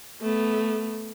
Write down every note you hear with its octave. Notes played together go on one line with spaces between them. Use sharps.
A3 B3